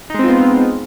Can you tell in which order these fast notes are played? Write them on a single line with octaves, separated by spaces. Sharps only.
D#4 G#3 C4 F4 B3